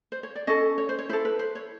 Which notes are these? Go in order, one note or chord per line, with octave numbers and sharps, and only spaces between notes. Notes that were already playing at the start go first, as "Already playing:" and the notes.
C5
C#5
D5
C#4 E4 A4 D#5
C#5
C5
C#5
E4 A4 C5
B4
C5
C#5